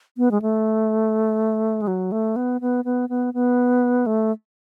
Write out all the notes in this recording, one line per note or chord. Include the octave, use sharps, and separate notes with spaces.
B3
G#3
A3
G#3
F#3
A3
B3
B3
B3
B3
B3
A3